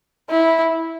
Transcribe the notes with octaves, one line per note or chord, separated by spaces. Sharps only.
E4